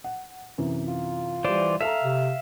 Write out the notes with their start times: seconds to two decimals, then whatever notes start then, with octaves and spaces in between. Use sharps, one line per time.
0.04 F#5
0.58 F#2 C3 E3
0.87 F4
1.44 E3 G3 C5 D5 E7
1.81 A4 E5 F5 A#5
2.03 C3